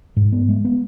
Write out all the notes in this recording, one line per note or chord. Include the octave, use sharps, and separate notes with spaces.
G#2
B3
G#3
B3